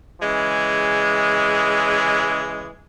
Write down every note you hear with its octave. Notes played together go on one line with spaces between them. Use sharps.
C#3 E3 G#3